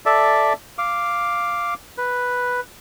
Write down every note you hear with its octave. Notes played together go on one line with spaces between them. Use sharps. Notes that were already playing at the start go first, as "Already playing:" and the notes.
A4 D5 E5
F5 D6
B4